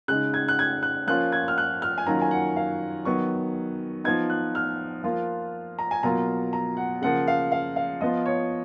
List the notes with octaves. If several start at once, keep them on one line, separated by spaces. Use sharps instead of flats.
C#3 G#3 D#4 F#6
G#6
F#6
G#6
F#6
F3 A#3 C#4 F4 F#6
G#6
F6
F#6
F6
G#5
D#3 F#3 A#3 C#4 F4 A#5
G#5
F#5
F5
D#3 F#3 B3 C#6
F3 B3 D#4 G#6
F#6
F6
F3 A#3 F4
A#5
G#5
B2 F#3 A#3 F4 A#5
A#5
F#5
C#3 F3 A#3 F#5
F5
F5
F5
F3 B3 F4 D#5
C#5